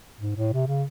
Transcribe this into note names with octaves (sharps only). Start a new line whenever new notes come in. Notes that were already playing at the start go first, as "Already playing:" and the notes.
G#2
A2
C3
C#3